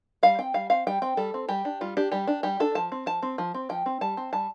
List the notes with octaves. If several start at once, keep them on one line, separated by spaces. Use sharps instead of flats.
G3 F5
C4 G5
G3 F5
C4 F5
G3 G5
C4 G5
G3 A4
C4
G3 G4
D4
G3 F4
D4 G4
G3 G4
D4
G3 G4
D4 A4
F3 A5
C4
F3 A5
C4
F3
C4
F3 G5
C4
G3 A5
C4
G3 A5